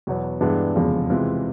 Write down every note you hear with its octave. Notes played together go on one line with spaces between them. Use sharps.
E2 B2 F#3 B3
G2 E3 G#3 B3 D4
F1 E2 C#3 F3 G#3
C3 E3 G#3 C4 F4